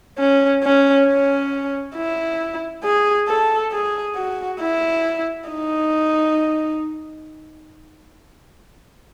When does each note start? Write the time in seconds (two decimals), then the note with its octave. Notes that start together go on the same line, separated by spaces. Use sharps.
0.19 C#4
0.63 C#4
1.07 C#4
1.96 E4
2.84 G#4
3.28 A4
3.73 G#4
4.16 F#4
4.61 E4
5.49 D#4